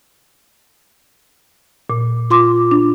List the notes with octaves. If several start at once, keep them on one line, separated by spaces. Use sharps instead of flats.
A#2
F4 C6 D6
D4